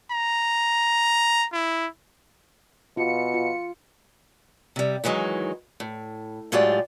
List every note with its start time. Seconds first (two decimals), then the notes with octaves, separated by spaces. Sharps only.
0.11 A#5
1.53 E4
2.97 B2 F4 C#7
3.34 F4
4.76 C3 G3
5.04 D#3 E3 F#3 G#3 D#4
5.80 A2
6.52 A2 F#3 G#3 F4 G4 D5